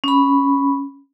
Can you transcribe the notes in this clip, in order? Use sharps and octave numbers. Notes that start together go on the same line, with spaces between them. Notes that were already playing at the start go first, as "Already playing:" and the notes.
C#4 B5